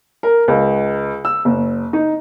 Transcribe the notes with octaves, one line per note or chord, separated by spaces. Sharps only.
A#4
C#2
E6
F#1
D#4